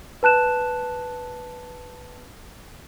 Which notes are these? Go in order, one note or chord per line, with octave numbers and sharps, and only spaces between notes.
B4 A5 F#6 E7